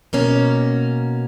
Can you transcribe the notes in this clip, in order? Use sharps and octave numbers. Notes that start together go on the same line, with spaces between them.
B2 A#3 C#4